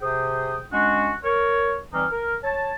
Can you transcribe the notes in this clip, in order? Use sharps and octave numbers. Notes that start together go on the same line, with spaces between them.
C3 G#4 C5 G5 D#6
G#3 C#4 D4 F#4
A#4 C#5
E3 G3 C4 D#4 F6
A#4
C#5 A5